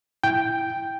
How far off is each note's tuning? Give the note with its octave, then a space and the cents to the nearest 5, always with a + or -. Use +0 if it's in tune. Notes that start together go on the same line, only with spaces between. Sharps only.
E4 +0 G5 +0